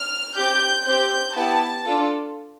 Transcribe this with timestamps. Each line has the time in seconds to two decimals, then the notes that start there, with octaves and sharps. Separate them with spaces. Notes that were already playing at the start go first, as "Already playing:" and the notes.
Already playing: F6
0.36 C4 G4 G6
0.86 C4 G4 G6
1.35 B3 E4 G4 A5
1.85 D4 F4 A4